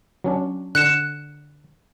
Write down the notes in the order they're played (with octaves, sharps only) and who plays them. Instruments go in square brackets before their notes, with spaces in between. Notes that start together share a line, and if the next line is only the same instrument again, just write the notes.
[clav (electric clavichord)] F#3 C#4 D4
[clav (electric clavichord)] D3 [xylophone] F#6 C#7 E7